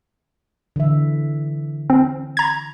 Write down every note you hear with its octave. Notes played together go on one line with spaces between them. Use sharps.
D3 E3 E5
C4
A#5 G#6